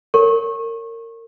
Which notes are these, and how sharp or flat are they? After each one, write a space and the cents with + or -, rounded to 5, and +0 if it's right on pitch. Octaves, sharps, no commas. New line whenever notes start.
A#4 -30 C#5 +0 C#6 -25